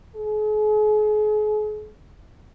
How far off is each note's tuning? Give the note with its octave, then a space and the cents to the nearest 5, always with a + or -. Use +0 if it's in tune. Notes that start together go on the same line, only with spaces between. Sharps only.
G#4 +40